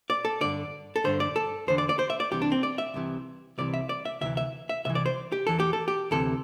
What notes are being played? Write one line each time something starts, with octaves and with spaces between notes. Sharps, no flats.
D5
A4
G2 D3 D5
A4
G2 D3 C5
D5
A4
E2 D3 C5
D5
D5
C5
E5
D5
C2 C3 E3 G4
D4
C4
D5
E5
C2 C3 E3
C2 C3 E3 D5
E5
D5
E5
D2 C3 E3 E5
E5
E5
C2 C3 E3 E5
D5
C5
G4
E2 E3 A4
G4
A4
G4
D2 C3 E3 A4